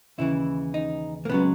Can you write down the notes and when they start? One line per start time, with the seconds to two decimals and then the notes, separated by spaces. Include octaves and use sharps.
0.18 D#2 C#3 E3 E4
0.74 D#4
1.25 A#3
1.29 C#2 C#3 F#3 B3